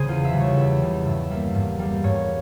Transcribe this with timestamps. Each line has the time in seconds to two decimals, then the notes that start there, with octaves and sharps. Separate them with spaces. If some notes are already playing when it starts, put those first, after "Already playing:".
Already playing: C#3 G#4 C5
0.08 E2 F4
0.25 E5
0.33 C#3 G3
0.40 C#5
0.56 E2 E5
0.82 C#3 G3
1.05 G2 E5
1.30 G3 A#3 E5
1.55 G2
1.79 G3 A#3
2.04 G2 C#5